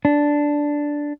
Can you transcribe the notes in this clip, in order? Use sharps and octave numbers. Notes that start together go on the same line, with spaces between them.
D4